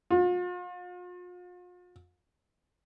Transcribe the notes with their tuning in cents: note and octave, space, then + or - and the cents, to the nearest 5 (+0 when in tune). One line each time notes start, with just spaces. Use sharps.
F4 +40